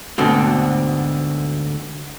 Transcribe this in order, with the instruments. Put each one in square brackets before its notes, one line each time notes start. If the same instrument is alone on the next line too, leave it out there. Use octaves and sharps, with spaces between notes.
[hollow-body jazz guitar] D2 G#2 B2 D3 C4